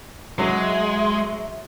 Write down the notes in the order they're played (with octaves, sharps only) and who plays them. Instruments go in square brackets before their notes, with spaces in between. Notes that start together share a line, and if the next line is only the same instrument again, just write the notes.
[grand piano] F#3 [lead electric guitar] G#3 [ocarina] E5